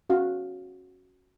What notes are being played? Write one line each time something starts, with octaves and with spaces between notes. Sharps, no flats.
C#4 F#4 F5